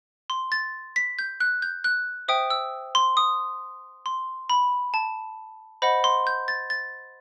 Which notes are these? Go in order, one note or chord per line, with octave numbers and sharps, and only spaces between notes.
C6
A6
B6
G6
F#6
G6
F#6
C5 E5 G5 D#6
E6
C6
D#6
C6
B5
A5
C5 D#5 F#5 B5
C6
G6
A6
A6